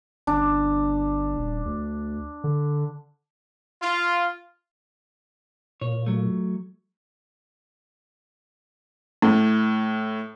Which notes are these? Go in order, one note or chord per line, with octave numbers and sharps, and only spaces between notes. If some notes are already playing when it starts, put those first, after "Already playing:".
G1 D4
D#1
D2
D3
F4
A#2 C#5
F#3 A3
A2